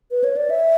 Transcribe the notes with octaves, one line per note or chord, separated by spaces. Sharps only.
B4
C#5
D5
E5